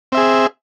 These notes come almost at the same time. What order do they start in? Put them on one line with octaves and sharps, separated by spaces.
C4 E5 G#4